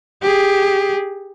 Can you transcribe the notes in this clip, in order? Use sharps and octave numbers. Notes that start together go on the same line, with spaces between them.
G4 G#4